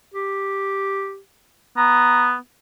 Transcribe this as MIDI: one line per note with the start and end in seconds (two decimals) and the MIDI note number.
0.14 1.19 67
1.77 2.35 59
1.77 2.27 82